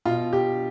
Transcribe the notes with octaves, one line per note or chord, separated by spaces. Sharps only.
B2 F4
G4